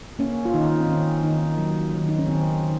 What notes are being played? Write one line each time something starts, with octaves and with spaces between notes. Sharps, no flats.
A#3 C#4
F4
D#3 D#4
C4
D#3 C#4
D#3 D#4
F#3
D#3
D#4
C#4
D#3 C4
D#3